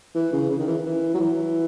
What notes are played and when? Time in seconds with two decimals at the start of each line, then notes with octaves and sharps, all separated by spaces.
0.15 E3
0.33 C#3
0.50 C#3
0.59 D#3
0.67 E3
0.85 E3
1.14 F#3
1.20 E3